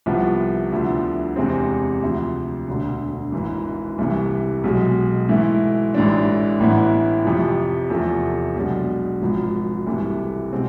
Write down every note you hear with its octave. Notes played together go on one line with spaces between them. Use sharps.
C2 C3 F3 B3 E4
D2 D3 F3 B3 E4
E2 C3 G#3 C4
D2 C3 F3
E1 D2 D3
G#1 G#2 E3
C2 C3 E3
B1 B2 G#3
G#2 E3 A3 E4
A1 G#2 E3 A3 D4
A1 A2 E3 B3 E4
F2 C3 F3
E2 C3 F3 A3
B1 B2 G#3 D4
G#1 G#2 F3
C2 C3 E3 A3
B2 G#3 C4